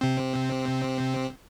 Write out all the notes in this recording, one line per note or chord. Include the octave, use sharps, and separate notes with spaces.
C3 C4